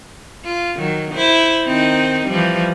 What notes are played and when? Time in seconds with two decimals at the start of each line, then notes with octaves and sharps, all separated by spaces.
0.45 F4
0.77 D#3 F#3
1.14 E4 C5
1.66 D#3 C4 D#4
2.26 E3 F3 G3